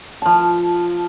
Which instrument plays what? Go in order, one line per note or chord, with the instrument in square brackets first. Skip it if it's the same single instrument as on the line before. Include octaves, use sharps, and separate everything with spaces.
[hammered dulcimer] F3 A5